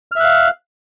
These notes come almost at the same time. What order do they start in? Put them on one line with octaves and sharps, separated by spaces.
F6 E5 F#6 F5